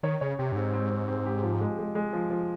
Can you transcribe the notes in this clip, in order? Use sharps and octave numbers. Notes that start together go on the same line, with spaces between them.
D#3 C#5
C#3 C#5
C3 G4
G2
G#2 C4
C4
C4
C4
G4
F3
G#3
G#3
G#3
F3
F3